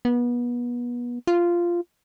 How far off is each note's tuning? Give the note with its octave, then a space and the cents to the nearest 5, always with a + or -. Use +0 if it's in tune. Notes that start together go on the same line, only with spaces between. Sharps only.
B3 -30
F4 -10